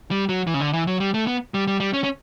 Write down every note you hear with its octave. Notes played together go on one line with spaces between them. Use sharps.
G3
F#3
E3
C#3
D3
E3
F#3
G3
A3
B3
G3
G3
G3
C#4
C#4